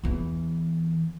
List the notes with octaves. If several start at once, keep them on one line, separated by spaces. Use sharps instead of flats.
E2 E3